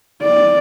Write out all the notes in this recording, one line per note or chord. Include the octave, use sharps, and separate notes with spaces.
D5